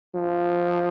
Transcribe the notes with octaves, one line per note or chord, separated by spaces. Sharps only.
F3